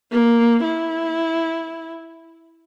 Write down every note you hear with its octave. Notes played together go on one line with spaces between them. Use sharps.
A#3
E4